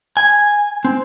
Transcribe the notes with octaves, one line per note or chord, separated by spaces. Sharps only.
G#5
C4